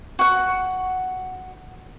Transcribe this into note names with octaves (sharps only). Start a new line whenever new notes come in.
F#4 F#5